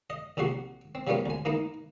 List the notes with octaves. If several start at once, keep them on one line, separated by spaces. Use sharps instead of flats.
D#5
A#1 C3 F3 F#4 C6
C4
F3 G3 A#3 B3 C#4 F4
D2 G#5
E3 A#3 D#4 E4